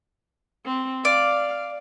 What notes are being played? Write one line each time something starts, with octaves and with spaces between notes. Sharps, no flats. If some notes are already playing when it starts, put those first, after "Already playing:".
C4
D5 F5